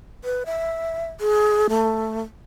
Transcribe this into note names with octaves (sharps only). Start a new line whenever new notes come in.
B4
E5
G#4
A3